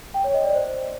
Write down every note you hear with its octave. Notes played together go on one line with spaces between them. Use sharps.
G5
C#5
D#5
D5
C5